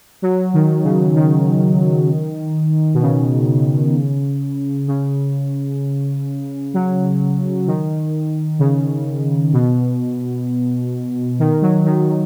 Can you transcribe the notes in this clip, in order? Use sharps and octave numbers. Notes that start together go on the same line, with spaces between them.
F#3
D#3
C#3
D#3
B2
C#3
C#3
F#3
D#3
C#3
B2
D#3
F#3
D#3
D#3